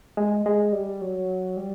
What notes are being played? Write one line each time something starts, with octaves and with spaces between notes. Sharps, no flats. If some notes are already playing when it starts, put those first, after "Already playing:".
G#3
G#3
G3
F#3
G3